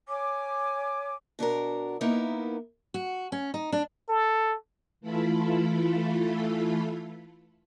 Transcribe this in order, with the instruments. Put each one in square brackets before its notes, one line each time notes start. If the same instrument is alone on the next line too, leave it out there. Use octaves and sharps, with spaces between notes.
[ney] C#5 [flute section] G#5 D6
[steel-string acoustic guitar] B2 D4 F#4 A#4
A#3 B3 D#4 E4 A#4
F#4
C#4
D#4
D4
[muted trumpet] A4
[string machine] E3 A3 E4 F4 A4 B5